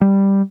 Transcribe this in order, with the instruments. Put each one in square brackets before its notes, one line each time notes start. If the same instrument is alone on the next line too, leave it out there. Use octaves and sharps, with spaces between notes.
[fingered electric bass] G3